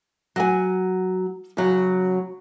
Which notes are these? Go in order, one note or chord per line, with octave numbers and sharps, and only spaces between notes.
F#3 F#5 G#5
C#3 F#3